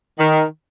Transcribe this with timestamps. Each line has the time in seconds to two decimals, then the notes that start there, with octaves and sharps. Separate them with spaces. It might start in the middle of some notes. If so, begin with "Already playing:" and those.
0.19 D#3